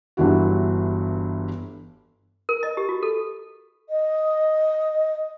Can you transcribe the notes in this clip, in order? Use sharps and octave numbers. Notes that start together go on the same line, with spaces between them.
G1 G2 E3 E4 F#4
A#4
D#5
G4
F#4
A4
D#5